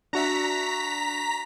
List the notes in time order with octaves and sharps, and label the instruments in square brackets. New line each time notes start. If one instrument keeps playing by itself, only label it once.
[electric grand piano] D4 F#4 E5 [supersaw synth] A#5 B6